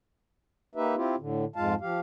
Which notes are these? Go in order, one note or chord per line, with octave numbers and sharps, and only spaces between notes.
A#3 D#4 G4 B4 E5
C4 E4 F4 G4
A2 D3
F2 G#2 G#3 F4 F5 A5
F3 G4 F5